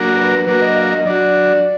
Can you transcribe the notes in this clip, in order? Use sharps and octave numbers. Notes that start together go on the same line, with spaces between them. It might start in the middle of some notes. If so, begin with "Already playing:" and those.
Already playing: F#3 A#3 D4 F#4 A#4
B4
F#3 A#3 D4 F#4 A#4 B4
D#5
F5
D#5
F#3 D4 F#4 D5